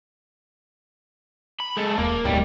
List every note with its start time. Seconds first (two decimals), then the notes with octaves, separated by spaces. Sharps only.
1.60 B5
1.77 G#3 A4
1.98 D#1 A#3
2.25 D1 B1 G#2 G3